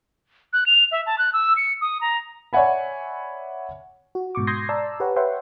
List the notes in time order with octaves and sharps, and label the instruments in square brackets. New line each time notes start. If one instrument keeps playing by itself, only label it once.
[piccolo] F#6
F7
E5
A5
F#6
E6
C#7
D#6
A#5
[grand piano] C#5 D5 E5 F#5 G#5 B5
[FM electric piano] F#4
G#2 B2 C#6 D6
C6 D#6 G6 G#6 A#6 C7
D5 A5 A#5 E6
G4 B4 C#5 F#5
B4 C#5 E5 F#5 G5 C6